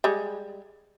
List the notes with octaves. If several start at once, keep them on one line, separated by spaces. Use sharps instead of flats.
G3 G#3